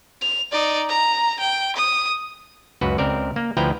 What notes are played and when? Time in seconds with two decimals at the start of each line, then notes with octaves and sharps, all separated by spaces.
0.22 F7
0.52 D#4 D5
0.89 A#5
1.40 G5
1.76 D#6
2.81 C#2 F#2 F#4 B4
2.98 C#2 C4 A#4 D5
3.36 A#3
3.57 D2 F3 E4 B4 G5 A#5